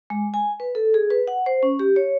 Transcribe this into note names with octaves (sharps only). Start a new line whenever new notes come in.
G#3
G#5
B4
A4
G#4
B4
F#5
C5
C#4
G4
C#5